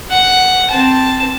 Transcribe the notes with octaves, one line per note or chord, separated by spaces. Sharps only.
F#5
C4 A5